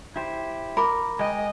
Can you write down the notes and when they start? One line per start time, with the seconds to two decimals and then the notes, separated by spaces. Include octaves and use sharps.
0.16 E4 G4 C5
0.77 A#4 B5 D6
1.19 G#3 D#5 G5 G#5